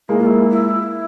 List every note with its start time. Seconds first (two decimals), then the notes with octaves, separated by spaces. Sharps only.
0.09 G#3 A#3 E4
0.18 F4
0.26 E4
0.50 E4